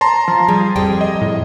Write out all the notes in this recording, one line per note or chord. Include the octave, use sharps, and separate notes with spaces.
A5 A#5 C6
F3
G3 G#4
F2 G3 G5
D#5
A2